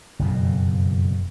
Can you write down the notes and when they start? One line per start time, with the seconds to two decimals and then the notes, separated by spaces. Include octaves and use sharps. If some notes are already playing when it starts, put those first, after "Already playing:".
0.19 F#1 F2 B2